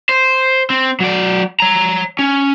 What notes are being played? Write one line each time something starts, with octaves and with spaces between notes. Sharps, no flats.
C5
C4
F#3 D5
C#5 A#5
C#4